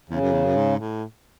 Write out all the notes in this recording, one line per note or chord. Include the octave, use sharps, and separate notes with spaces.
E2 C#3
F#2
E2
F#2
G#2
A2